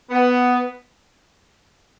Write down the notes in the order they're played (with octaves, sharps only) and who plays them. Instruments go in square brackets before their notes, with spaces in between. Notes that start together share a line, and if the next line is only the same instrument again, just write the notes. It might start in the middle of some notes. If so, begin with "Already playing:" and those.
[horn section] B3